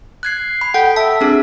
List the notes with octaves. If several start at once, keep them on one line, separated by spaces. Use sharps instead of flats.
F#6 G#6 C7
B5
A4 F#5 G5
E5 A5
C4 D4 G#4